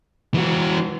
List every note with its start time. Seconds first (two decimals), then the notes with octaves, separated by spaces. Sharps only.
0.34 E3 F#4